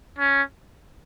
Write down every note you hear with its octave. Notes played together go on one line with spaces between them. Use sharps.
C#4